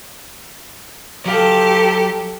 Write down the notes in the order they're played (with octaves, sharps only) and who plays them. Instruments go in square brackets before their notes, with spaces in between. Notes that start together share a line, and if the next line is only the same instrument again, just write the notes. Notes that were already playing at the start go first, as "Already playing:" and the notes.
[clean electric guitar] F#3 F5 [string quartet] G4 A4